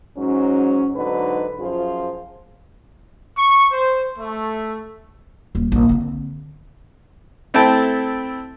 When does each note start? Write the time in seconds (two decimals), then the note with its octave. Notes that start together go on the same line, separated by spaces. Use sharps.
0.17 G#2 F#3 C#4
0.95 G#2 D3 F#3 D#4 B4
1.59 F#2 F3 F4 G#4 C5
3.37 C#6
3.71 C5
4.18 A3
5.55 D#1
5.72 A#1
5.89 D3 C4
7.54 A3 C4 E4 G5 A5